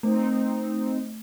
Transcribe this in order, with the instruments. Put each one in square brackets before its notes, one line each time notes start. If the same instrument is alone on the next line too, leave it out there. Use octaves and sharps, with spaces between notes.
[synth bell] A3 [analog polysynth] C4 D#4